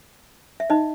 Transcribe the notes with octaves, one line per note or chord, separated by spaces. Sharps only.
E5
D#4 D#5